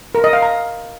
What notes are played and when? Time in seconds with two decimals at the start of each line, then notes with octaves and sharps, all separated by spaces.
0.15 A#4
0.24 D#5
0.33 F5
0.42 A#5